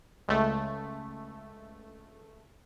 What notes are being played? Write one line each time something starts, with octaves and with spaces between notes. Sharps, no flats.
C#2 A3